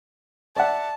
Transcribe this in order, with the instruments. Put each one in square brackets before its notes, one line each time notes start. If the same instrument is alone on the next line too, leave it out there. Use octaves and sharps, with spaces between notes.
[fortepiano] D5 E5 F#5 [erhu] A5